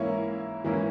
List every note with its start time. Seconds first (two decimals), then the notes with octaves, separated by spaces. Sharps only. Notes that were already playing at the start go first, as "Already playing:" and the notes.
Already playing: G#2 E3 A#3 C#4 E4 C#5
0.64 G#2 E3 A#3 C#4 E4